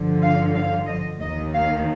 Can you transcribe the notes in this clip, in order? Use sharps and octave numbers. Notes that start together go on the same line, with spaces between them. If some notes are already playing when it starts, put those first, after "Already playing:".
Already playing: G2 D3 F3
F5
F5
D#5
D#2 D#3 D#5
F5